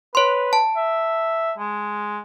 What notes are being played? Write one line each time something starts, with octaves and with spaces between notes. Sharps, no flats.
B4 C#5 C6
A5
E5
G#3